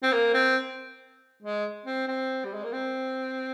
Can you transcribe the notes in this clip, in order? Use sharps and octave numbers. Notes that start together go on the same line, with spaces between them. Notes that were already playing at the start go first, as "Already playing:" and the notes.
C4
A#3
C4
G#3
C4
C4
G3
G#3
A#3
C4